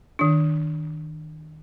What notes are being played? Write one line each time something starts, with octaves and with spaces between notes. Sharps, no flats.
D#3 D4